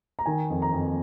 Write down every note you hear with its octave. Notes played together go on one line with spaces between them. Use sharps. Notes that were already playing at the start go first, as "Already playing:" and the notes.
A#5
D#3 G#5
F2
A#5
F2